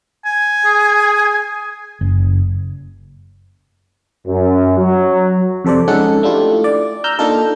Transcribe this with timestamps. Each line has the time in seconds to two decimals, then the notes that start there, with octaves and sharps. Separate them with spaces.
0.26 G#5
0.65 G#4
2.01 F#1
4.27 F#2
4.79 F#3
5.65 F2 C3 A4 C5 D5
5.88 G#3 C#4 D#4 A4 F#5
6.23 A3 D4 E4 F4 G4
6.64 D5
7.04 A#5 E6 F6 G6
7.19 A#3 D4 D#4 F4 A4 A#4